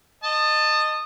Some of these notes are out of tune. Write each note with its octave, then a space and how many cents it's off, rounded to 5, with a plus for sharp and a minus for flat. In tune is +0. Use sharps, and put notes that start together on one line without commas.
D#5 -15 A5 +15